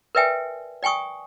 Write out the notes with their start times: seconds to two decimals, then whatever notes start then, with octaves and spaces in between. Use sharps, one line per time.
0.15 A#4 B4 D5 E5 G5 G#5
0.83 D5 G5 G#5 C#6 D#6